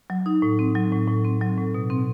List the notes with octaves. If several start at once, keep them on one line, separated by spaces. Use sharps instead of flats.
F#3
D#4
A2
C4
F#3
A2
A2
C4
F#3
A2
B2
C4